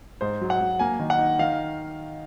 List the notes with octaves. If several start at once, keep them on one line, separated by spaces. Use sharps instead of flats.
G#2 C5
F#3
F#5
F#3
A#3 G#5
D#3
F#5
D#4
D#3 F5